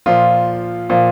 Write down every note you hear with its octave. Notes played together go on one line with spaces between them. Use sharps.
A#2 F3 F4
A#2 F3